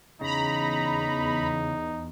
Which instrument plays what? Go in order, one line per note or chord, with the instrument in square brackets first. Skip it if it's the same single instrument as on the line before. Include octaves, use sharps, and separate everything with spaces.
[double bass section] E2 [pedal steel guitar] C#3 [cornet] D#4 [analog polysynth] A#5 B5